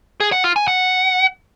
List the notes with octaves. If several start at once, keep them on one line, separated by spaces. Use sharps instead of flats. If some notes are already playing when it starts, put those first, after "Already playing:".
G#4
F#5
F4
G#5
F#5